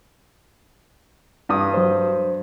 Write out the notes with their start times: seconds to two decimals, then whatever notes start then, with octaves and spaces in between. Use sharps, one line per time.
1.49 G2 D#6
1.74 F#3 C5